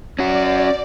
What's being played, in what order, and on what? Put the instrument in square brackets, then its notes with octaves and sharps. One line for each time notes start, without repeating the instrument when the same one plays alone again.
[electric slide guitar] C#4 F#4 [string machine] D5